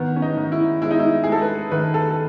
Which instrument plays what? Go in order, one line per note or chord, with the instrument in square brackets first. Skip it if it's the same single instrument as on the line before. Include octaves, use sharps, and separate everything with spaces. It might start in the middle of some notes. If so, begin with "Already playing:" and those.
Already playing: [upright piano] D#3 B3
C#4
D#4
D#3
E4
G#3 E4
D#4
E4
G#3 G#4
A4
B4
D#3 B4
A4
A4